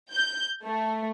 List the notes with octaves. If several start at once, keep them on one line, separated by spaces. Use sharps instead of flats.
G6
A3